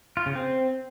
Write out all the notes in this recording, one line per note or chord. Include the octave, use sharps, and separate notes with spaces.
F4
C#3
C4